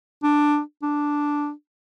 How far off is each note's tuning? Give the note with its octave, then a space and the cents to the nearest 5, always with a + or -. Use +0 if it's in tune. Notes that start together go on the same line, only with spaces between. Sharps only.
D4 +5
D4 +0